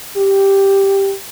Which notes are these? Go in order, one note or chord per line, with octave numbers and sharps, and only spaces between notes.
G4